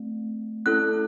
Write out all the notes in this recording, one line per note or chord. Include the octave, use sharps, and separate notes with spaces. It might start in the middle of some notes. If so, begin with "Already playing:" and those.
Already playing: A3 C4
A3 C#4 E4 A4 F#6